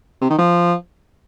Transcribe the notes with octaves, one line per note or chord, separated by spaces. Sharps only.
C3
D#3
F3